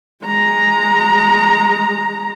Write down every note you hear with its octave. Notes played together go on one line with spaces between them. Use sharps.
G#3 A#5